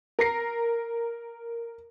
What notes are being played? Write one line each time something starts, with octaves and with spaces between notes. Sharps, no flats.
A#4 A#5 A#6 C7